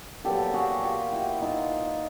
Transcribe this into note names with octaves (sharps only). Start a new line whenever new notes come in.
A#2 F#3 B3 G4 A4
F#4 G#4
F4 G4
E4 F#4
D#4 F4